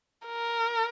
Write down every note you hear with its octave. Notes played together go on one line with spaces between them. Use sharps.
A#4